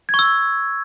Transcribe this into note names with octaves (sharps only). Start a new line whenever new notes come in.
G#6
C#6
E6